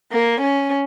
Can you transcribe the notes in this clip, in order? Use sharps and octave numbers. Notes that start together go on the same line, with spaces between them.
A#3
C#4